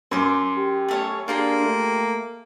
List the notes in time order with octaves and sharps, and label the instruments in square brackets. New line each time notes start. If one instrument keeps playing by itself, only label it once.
[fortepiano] F#2 [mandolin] C6 D6
[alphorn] G4
[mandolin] A3 C#4 C#5
[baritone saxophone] A#3 [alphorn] D4 [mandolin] F4 G4 G#4
[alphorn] A3